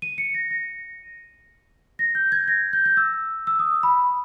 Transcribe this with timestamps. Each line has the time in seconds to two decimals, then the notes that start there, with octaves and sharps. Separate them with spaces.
0.02 D#7
0.18 C#7
0.34 A#6
0.51 A#6
1.99 A#6
2.15 G6
2.32 G#6
2.48 A#6
2.73 G6
2.86 G6
2.97 E6
3.47 E6
3.59 D#6
3.83 B5